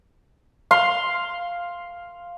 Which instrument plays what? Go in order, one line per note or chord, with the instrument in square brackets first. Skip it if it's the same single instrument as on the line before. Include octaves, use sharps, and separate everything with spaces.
[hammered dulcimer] F5 C6